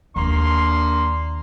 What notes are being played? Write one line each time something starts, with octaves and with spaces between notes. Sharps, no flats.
D#2 A#3 D4 C6